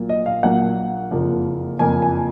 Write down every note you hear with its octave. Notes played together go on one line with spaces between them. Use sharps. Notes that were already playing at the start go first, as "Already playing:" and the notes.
Already playing: A#1 A#2 F#3 A#3
D#5
F5
A#1 A#2 F#3 A#3 F#5
F#1 F2 F3 A#3
F#1 F2 F3 A#3 G#5
G#5